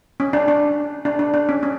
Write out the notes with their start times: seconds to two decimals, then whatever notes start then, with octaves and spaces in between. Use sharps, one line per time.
0.20 C#4
0.33 D4
0.48 D4
1.05 D4
1.19 D4
1.34 D4
1.49 C#4
1.63 C#4